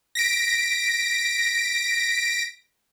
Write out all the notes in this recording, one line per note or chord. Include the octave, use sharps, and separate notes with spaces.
A#6 B6 D7